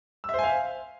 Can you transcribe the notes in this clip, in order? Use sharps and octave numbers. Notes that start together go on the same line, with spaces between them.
C5 E5 F5 G#5 E6